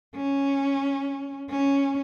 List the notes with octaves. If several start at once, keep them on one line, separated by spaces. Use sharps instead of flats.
C#4
C#4